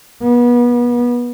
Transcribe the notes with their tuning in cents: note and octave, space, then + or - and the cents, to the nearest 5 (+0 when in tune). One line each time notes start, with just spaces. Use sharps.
B3 -30